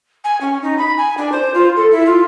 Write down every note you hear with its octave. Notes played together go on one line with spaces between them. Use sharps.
G#5
C#4
D#4
B5
G#5
D4
C5
F4
A4
E4
F4